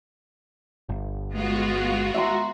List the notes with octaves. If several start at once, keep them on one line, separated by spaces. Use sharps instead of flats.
G1
G#3 B3 F4 F#4
E5 A#5 C6